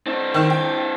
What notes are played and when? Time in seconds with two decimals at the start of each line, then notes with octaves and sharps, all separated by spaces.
0.07 C4 D4
0.34 D#3
0.50 G5